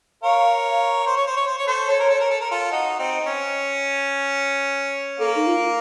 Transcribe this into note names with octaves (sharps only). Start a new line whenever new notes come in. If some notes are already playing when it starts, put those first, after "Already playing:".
A#4 C#5 F5
C5
C#5
C5
C#5
C5
C#5
A4 C5
A4 C#5
A#4
A4
A#4
A4
A#4
F4 A4
D#4 F#4
C4 D#4
C4
C#4
A#3 A4
D#4
F4